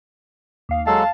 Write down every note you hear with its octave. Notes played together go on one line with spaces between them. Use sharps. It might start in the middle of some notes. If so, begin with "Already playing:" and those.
D#2 F5
F#3 G#3 A4 F5 A5